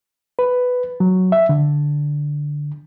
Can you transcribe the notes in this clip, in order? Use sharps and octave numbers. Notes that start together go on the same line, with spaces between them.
B4
F#3
E5
D3